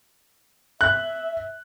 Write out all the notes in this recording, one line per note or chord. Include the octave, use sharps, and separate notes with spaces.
E5 F#6